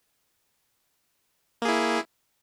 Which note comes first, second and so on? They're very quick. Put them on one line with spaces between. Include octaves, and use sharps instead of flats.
A#3 G#4 E4